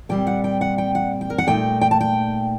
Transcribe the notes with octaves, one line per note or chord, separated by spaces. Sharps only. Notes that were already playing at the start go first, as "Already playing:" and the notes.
A#2 G3 C4 G5
F#5
G5
F#5
G5
F#5
G5
A#4
F#5
A#2 A3 D#4 G5
G5
A5
G5